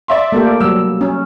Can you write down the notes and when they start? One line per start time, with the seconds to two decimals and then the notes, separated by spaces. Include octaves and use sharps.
0.08 D5 E5 C6
0.32 A3 A#3 G4
0.61 F#3 G3 E6
1.01 C#4